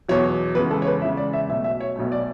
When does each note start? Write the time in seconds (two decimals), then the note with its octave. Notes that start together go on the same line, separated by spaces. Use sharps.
0.09 E2 B2 F#3 C#5
0.55 E2 C#3 G#3 B4
0.71 A4
0.82 C#5
0.86 B4
1.02 E2 C#3 G#3 E5
1.17 D5
1.33 E5
1.49 B1 B2 A3 E5
1.64 E5
1.80 C#5
1.96 B1 B2 A3
2.12 D5